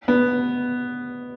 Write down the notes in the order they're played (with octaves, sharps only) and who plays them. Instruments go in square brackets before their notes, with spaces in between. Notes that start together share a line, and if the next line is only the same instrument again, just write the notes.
[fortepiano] B3